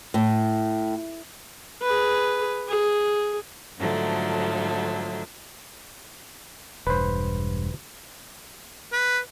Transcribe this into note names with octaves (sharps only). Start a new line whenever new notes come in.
A2
G#4 B4
G#4
G#2 D3 F3 F#3 A3
E1 G2 B4 C5
B4